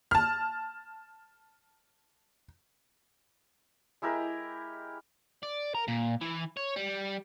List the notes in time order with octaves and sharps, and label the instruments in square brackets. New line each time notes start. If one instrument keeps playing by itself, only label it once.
[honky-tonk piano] A5 F6
[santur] G#3 E4 G4 A#4
[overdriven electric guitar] D5
A#4
A#2
E3
C#5
G3